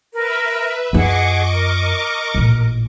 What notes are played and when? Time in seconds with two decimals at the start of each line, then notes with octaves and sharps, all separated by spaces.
0.13 A#4 B4 E5
0.93 F#2 F4 G#4 D#5 F#5 C#6 D6
1.51 A#4
2.34 A1 A#2